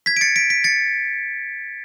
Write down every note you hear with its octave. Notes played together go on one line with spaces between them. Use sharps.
G#6 B6
D7
A6 C#7
B6 D7
B6 D7
A6 C#7